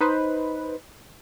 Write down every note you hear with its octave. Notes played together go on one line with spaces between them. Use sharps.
D#4 B4 C5